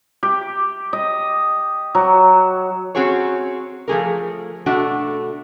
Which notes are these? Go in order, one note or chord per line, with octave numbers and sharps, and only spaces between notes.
G4
D#5
F#3
C4 C#4 F#4 G#4 C#5
F3 A3 G#4 A#4
B2 A3 D4 F#4